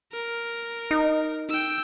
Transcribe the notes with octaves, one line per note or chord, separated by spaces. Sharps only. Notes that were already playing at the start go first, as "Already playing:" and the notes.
A#4
D#4
G5 E6